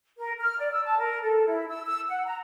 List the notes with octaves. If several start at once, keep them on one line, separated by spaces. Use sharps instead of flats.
A#4
F6
D5
E6
A5
A#4
A4
E4
E6
E6
F#5
A#5